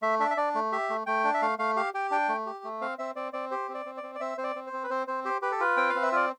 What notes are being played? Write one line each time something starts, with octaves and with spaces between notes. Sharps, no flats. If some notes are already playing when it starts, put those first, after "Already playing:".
A3 E5
D4 E5
E5
D4 D5
A3
G4 E5
A3
A3 G5
D4
E5
A3 F5
A3 F5
G4 F5
G4 G5
D4 G5
A3
G4
A3
C4 F5
C4 E5
C4 D5
C4 D5
G4 C5
C4
D5
C4
D5
C4
D5
C4 E5
C4 C5
D5
C4
C5
C4
B4
C4 C5
C4 C5
G4 C5
G4 B4
A4
F4 B4
C4 G5
F5
C4
E5
F4 D5